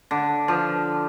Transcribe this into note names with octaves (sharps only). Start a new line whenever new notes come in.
D3
F3